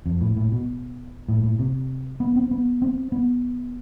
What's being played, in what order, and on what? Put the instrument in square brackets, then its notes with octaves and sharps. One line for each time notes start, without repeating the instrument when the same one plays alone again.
[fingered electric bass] F2
A2
A2
B2
A2
A2
C3
B3
C4
B3
C4
B3